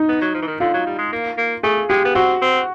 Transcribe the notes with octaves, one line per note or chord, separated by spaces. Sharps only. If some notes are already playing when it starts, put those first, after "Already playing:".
Already playing: D#4
B3
F#3
F3
E3
D#3
D3 F4
F#3
G3
G#3
A#3
A#3
A3 G#4
G#3 G4
B3
C4 F#4
C4